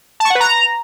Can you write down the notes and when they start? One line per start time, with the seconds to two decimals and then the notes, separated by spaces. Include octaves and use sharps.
0.20 A5
0.25 C#6
0.30 F#5
0.35 B4
0.40 A#5